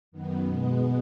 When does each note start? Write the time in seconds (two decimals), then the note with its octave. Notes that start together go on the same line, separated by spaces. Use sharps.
0.12 F#2 D#3 B3
0.45 B2 G#3 B3